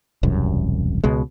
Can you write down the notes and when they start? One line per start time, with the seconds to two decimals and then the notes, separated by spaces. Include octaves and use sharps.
0.23 E1 C2 F#2
1.04 C#2 B2 G#3